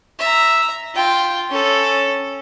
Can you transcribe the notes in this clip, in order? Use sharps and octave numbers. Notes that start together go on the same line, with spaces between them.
E5 A#5
F4 G5
C#4 A4